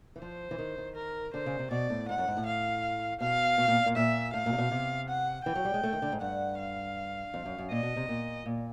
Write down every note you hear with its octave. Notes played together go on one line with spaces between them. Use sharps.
E3
F3 C5
E3
D#3
D#3
A#4
D3 C5
C#3
C3
B2 D5
A2
G#2 F#5
F#2
G#2
A2
F5
B2 F5
B2
A#2
A#2
A#2 E5
A2 F5
A#2
C3
B2
C3
F#5
E3 G5
F#3
G3
G#3
A3
D#3
D3
G#2
G2 F#5
F5
F2
F#2
F#2
A#2 D#5
B2
C3
A#2
A#2